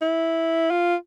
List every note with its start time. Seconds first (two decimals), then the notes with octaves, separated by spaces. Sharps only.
0.01 E4
0.71 F4